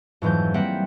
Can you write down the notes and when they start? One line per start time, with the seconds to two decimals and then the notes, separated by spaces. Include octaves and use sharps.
0.22 F2 G#2 E3 F#3 G6
0.54 G3 A#3 C4 E5 F#5 G5